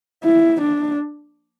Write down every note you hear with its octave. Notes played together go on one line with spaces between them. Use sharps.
E4
D4